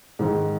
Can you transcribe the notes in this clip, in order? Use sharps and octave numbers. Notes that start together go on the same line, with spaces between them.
G#2 D#3 G#3